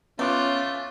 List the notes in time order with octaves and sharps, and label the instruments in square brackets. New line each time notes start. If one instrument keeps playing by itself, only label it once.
[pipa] A3 [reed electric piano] B3 D6 F#6 [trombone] C#4 [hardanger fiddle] F4